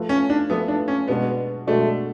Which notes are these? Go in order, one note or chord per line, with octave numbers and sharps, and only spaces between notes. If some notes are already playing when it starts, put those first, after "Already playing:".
Already playing: F3 A3 F4 B4
C#4
D4
F3 A3 B3 F4 B4
D4
C#4
B2 G#3 B3 D4 F#4
B2 G#3 A3 D4 F#4